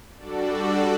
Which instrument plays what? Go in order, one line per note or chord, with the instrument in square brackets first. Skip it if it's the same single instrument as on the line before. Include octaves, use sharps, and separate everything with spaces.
[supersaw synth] G3 D4 F#4 A4 D5